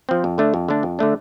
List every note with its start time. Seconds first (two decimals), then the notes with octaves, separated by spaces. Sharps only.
0.09 F3 C4
0.24 F2
0.38 D3 A3 D4
0.54 F2
0.69 D3 A3 D4
0.83 F2
0.99 D3 A3 D4